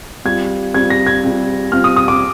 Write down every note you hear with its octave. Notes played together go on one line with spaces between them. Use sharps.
G3 C4 F4 G#6
G3 C4 F4 G#6
A#6
G#6
G3 C4 F4
G3 C4 F4 F6
D#6
D#6
D6